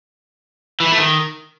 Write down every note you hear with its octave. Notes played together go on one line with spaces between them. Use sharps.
E3
E4
A3
D#3